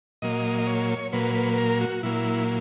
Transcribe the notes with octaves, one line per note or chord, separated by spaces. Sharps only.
A#2 F#3 A#3 D#5
D#5
C#5
A#2 F#3 A#3 B4
B4
B4
A#4
F#4
A#2 F#3 A#3 E4